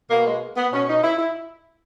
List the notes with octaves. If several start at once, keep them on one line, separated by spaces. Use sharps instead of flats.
B2 A#3
G#3
B3
B2 C#4
D#4
E4
E4